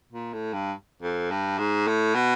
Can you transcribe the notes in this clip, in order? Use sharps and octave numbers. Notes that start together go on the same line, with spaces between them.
A#2
A2
G2
F2
G2
G#2
A2
B2